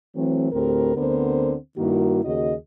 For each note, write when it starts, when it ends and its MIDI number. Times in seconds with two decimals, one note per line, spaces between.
0.15 0.51 52
0.15 0.51 54
0.15 0.51 57
0.15 0.51 60
0.52 0.92 38
0.52 0.92 45
0.52 0.92 60
0.52 0.92 67
0.52 0.92 70
0.97 1.54 38
0.97 1.54 50
0.97 1.54 59
0.97 1.54 60
0.97 1.54 70
0.97 1.54 72
1.78 2.22 43
1.78 2.22 51
1.78 2.22 58
1.78 2.22 64
1.78 2.22 66
2.24 2.53 39
2.24 2.53 49
2.24 2.53 66
2.24 2.53 68
2.24 2.53 75